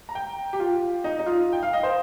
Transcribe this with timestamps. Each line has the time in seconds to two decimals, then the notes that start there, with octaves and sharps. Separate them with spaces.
0.09 A#5
0.15 G5
0.53 G4
0.60 F4
1.04 D#4
1.19 D#4
1.26 F4
1.53 G5
1.63 F5
1.73 D#5
1.83 C5